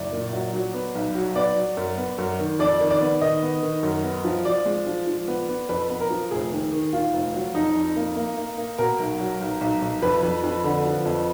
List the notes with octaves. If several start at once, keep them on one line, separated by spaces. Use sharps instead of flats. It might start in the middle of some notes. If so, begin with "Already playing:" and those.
Already playing: F#1 D5
A#2
F#3
F#3
B3
B1
F#3
B3 D5
F#3
F#2
B3
F#2
D#3
F2 D5
D#3
D5
B3
D#3 D#5
B3
D#3
F#2
B3
F3
F3 D5
G#3
F3
F3
B3
B3
F2 B4
B3
A#4
F3
F1 G#4
D#2
D#3
D#2 F4
F1
F#3
F2 D#4
F2
A#3
A#3
A#3
A#3
B2 A#4
B1
F#3
B1
B1
B1
F2 B4
F2
F2
D3
F3
F2